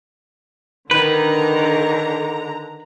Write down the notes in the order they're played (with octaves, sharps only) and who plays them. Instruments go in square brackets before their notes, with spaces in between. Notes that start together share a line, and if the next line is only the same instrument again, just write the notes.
[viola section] D3 A#5 [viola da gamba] D#3 [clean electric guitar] B4